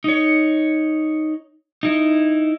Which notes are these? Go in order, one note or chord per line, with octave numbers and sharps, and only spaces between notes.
D#4 C#5
D#4 E4